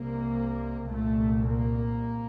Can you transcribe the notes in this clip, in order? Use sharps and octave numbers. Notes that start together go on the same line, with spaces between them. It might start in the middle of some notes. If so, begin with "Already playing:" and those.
Already playing: C2 C3 A#3
C2 A#2 A3
A#3